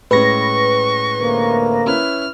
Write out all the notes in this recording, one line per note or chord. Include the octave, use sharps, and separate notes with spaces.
A2 G#3 C#4 B4 C#6 A#6
D2 C3 A#3
C#4 E4 B4 F6